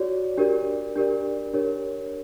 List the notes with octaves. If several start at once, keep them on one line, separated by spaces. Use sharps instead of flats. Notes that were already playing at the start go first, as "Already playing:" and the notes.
Already playing: F#4 C#5 D5
D4 G4 A#4 D5
D4 G4 A#4 D5
D4 G4 A#4 C#5